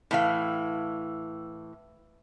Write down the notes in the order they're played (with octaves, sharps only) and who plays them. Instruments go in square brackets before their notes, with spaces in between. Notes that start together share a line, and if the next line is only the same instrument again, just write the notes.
[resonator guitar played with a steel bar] A2 E3 F5